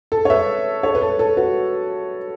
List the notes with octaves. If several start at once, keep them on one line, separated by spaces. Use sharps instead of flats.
A4
C#5
B4 E5
A4 C#5
B4
A4
A4
F#4 B4